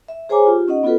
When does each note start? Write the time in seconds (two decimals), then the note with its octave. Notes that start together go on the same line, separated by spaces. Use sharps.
0.08 E5
0.29 G#4 C5 C#5 G#5 A#5 D6
0.46 F4 G4
0.68 C#4 D#4 D#5 F#5
0.83 B3 F4 F#4 A4 B4